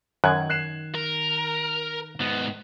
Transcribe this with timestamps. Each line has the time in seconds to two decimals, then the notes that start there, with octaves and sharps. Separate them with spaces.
0.24 F#2 D#3 F#6 G#6
0.50 F#6 C7 E7
0.95 A#4
2.21 G#2 B3